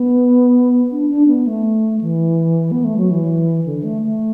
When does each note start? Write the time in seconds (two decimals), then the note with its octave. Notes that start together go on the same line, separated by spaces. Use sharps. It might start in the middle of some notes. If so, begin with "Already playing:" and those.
Already playing: B3
0.92 D4
1.10 D4
1.28 B3
1.47 A3
2.01 E3
2.71 B3
2.84 A3
2.97 F#3
3.11 E3
3.66 D3
3.84 A3
4.02 A3